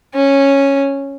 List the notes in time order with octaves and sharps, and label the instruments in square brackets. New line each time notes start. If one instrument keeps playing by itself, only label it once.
[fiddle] C#4